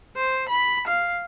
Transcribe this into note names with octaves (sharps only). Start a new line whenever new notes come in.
C5
B5
F5